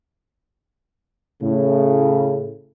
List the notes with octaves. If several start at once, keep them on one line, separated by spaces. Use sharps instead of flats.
A2 C#3